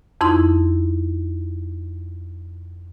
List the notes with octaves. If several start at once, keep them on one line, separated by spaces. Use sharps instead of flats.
F2 D#4 E4 C6